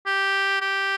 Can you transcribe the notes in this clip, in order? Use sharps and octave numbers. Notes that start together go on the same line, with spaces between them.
G4
G4